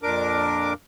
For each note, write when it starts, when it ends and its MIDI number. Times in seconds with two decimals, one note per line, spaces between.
0.03 0.74 41
0.03 0.74 46
0.03 0.74 62
0.03 0.74 70
0.03 0.74 86